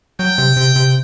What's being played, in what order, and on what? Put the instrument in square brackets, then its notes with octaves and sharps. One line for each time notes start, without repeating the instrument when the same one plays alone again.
[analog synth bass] F#3 [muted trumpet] G5
[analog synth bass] C3
C3
C3